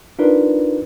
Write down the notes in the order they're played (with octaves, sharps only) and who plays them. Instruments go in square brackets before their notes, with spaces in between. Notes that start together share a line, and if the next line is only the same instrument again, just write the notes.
[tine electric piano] D4 D#4 F4 A#4 B4 D5